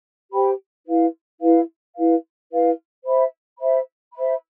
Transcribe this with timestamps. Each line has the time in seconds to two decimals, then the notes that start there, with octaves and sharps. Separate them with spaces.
0.32 G4 C5 G5 B5
0.86 E4 B4 F5
1.41 E4 B4 F5
1.95 E4 B4 F5
2.50 E4 B4 F5
3.05 C5 E5 B5
3.59 C5 E5 B5
4.14 C5 E5 B5